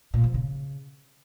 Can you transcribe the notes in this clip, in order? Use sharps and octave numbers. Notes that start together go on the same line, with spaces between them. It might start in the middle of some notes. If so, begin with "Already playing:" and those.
A#2
F3
C#3